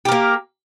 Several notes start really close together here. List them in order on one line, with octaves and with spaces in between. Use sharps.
G4 A#4 A#3